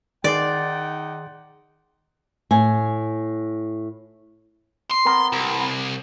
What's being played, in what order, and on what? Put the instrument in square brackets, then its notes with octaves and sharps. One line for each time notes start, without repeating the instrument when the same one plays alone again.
[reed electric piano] D#3 G#4 C6 [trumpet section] D#4 F#5 G5 [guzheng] D5
[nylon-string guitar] A2 G#5
[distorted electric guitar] C6
[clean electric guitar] B3 C4 A#4
[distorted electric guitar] C2